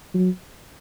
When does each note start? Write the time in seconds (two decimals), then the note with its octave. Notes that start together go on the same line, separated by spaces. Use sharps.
0.14 F#3